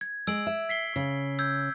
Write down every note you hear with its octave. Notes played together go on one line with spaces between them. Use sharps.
G#6
G#3 E6 D7 F#7
E5
B6 C7 G7
C#3
E6 G6 G#6